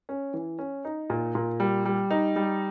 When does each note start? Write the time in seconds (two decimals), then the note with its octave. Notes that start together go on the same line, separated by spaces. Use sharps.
0.09 C#4
0.34 E3
0.59 C#4
0.85 D#4
1.10 A#2
1.35 A#2
1.60 G3
1.85 G3
2.10 D#4
2.36 G3